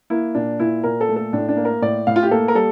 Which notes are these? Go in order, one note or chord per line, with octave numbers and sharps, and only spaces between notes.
A#3 E4
A#2 D4
A#2 E4
A#2 A#4
A4
A3
A4
A2 D4
D4
A#3
A#4
A2 D5
A2 F5
F4
G4
A#3 A4
A#4
G3 A4